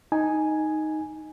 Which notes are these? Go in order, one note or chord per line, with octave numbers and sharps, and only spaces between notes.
D#4 G#5